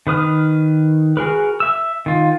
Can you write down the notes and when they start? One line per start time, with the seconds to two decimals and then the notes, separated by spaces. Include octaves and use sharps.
0.07 D#3 B4 D#6 F6
1.17 F#4 G#4 A#4 B4
1.60 E5 E6
2.06 D#3 F4